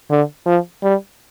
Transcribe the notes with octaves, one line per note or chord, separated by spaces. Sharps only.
D3
F3
G3